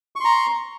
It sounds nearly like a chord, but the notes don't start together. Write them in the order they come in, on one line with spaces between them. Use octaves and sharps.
C#6 C6 A#5